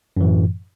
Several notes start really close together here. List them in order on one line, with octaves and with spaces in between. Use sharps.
F#2 E3 A2